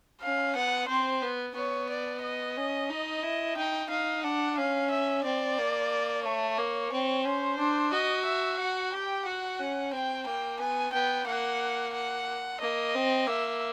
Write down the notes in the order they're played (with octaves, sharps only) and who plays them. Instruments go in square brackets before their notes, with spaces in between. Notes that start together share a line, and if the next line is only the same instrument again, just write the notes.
[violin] C#4 [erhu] F5
[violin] B3 [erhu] F#5
[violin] C4 [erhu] C5
[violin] B3
[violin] B3 [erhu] C#5
[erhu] D5
D#5
[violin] C#4
D#4
E4
[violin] D#4 [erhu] G5
[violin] D#4 [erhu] F5
[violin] D4 [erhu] F#5
[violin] C#4 [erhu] F5
[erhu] E5
[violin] C4 [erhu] D5
[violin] A#3
[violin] A3 [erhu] C#5
[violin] A#3
C4
[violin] C#4 [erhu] C5
[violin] D4
[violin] F#4 [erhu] D#5
[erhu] E5
F#5
[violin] G4 [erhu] G5
[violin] F#4 [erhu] F#5
[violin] C#4
[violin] C4 [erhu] G5
[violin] A#3 [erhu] G5
[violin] B3 [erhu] G#5
[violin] B3 [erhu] G5
[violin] A#3 [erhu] F#5
[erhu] F#5
[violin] A#3 [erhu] D#5
[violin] C4
[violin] A#3 [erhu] E5